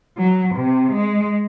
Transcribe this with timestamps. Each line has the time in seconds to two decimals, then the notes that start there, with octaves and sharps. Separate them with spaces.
0.17 F#3
0.56 C3
0.93 G#3